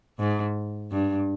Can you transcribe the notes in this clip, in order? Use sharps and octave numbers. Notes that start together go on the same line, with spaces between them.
G#2
G2